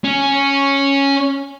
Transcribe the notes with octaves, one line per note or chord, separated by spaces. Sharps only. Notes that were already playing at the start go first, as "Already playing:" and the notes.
C#4